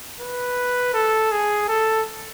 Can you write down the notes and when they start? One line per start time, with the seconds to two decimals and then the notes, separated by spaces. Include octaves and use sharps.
0.20 B4
0.94 A4
1.32 G#4
1.68 A4